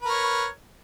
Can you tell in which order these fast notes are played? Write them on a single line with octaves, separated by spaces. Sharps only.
B4 A#4 C#5